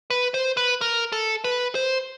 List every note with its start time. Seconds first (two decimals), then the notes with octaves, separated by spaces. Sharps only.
0.10 B4
0.34 C5
0.57 B4
0.81 A#4
1.12 A4
1.44 B4
1.75 C5